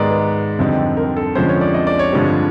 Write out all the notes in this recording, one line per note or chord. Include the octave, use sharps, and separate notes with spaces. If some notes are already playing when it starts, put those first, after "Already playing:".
Already playing: G#2 D#3 G#3 B3 D5
B4
F2 D3 G3 C4 D#4
A#4
A4
F2 D3 F3 G#3 C#4 C5
C#5
D5
D#5
D5
C#5
G2 D3 F3 G#3 C4